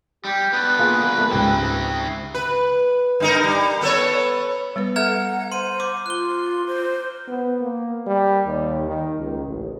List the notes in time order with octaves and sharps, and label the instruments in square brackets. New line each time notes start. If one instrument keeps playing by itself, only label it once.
[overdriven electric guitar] G3 [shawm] G4
[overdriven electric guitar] B3 D4 [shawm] B4
[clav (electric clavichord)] A#3 F4 G#4
A3 A#3
[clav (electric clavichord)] C#2 G#2 G4 [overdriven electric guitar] C4 E4
[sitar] B4
G2 D#4 A#4
G3
B3 A4 C#5
[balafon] G3 B3 B4
[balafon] A4 E5 [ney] F#5 [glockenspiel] A#5 F6 G#6
[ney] C5 [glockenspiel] C6 D#7
[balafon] C6 [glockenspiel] D6
[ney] F4 [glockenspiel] F#6 G7
[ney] C5
[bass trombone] B3
A#3
G3
D#2
D#3
C#2
A1